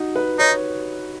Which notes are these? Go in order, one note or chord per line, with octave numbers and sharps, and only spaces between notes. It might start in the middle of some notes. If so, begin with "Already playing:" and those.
Already playing: D#4 F#4
B4
D#4 C#5